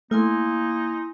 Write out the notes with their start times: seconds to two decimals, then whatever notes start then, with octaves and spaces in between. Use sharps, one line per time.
0.11 A3 A#3 D#4 E4 G#5 C6